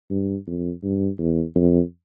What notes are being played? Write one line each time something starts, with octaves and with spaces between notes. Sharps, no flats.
G2
F2
G2
E2
F2